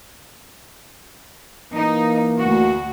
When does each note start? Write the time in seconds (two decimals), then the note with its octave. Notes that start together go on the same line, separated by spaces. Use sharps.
1.73 E3 A#3 D#4
2.38 D2 F#4